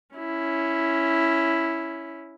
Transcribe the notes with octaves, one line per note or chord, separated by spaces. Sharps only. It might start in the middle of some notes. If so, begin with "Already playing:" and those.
C#4 E4